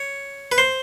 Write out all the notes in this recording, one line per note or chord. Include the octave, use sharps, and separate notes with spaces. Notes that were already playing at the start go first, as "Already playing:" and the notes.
Already playing: C#5
B4
C5